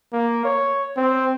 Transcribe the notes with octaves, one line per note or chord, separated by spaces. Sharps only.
A#3
C#5
C4